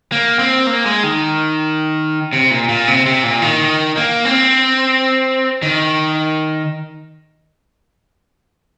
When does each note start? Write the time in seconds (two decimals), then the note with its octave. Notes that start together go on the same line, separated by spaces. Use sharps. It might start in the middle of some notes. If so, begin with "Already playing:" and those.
0.12 A#3
0.39 C4
0.67 A#3
0.86 G#3
1.03 D#3
2.33 C3
2.51 A#2
2.69 A#2
2.88 C3
3.06 C3
3.24 A#2
3.42 D#3
3.97 A#3
4.25 C4
5.62 D#3